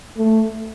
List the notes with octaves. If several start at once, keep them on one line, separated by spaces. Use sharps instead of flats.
A3